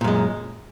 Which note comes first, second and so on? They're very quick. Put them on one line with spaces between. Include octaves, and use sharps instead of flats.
A#2 F#2 G#3